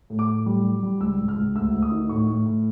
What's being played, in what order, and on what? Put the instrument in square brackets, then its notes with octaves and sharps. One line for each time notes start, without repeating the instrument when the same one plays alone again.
[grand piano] A2
D6
A2
G3
G3
G3
C#2 E6
C#2
F6
C#2
D2 E6
D2
D#6
D#3
A2 C#6
A2
A2